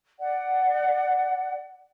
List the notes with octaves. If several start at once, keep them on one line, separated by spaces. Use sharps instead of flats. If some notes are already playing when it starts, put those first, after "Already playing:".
D5 F#5